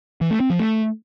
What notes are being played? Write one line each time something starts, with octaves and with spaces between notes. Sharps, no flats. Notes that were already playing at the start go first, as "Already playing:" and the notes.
E3
A3
C4
F3
A3